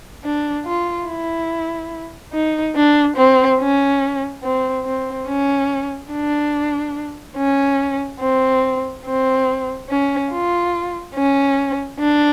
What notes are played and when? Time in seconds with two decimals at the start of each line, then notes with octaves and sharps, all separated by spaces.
0.24 D4
0.66 F4
1.07 E4
2.33 D#4
2.76 D4
3.17 C4
3.60 C#4
4.43 C4
4.85 C4
5.28 C#4
6.12 D4
7.37 C#4
8.21 C4
9.06 C4
9.90 C#4
10.31 F4
11.15 C#4
12.00 D4